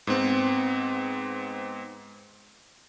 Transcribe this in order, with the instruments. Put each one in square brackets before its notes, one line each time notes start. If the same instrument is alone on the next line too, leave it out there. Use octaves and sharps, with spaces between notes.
[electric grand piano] G#2 B3 C4